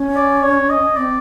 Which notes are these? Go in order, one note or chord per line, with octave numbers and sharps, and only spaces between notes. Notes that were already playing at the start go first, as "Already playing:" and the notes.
Already playing: C#4
D5
C#5
D#5
C4 D5